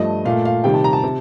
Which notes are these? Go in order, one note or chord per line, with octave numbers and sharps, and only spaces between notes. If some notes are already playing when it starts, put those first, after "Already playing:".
Already playing: G2 F3 A3 D#5
A#2 A3 F5
F5
C3 D#3 G3 G5
A5
A#5
A5
C3